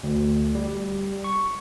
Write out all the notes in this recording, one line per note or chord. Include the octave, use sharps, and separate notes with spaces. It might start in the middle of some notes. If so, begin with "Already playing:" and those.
D2
G3
C#6